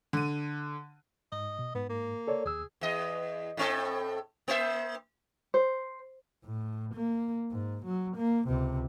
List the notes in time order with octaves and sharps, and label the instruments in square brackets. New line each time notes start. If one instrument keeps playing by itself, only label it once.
[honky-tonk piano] D3 D#7
[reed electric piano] G#2 [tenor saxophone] D#5
[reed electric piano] B2
[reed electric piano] G#2 [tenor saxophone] B3
[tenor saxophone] A#3
[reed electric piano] A4 C#5 D5
[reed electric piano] D#2 E6 [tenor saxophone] G#4
[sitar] E2 D#5
A2 C4 A4
A#3 C5 E5
[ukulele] C5
[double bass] A2
A#3
G#2
F#3
A#3
C#2 C3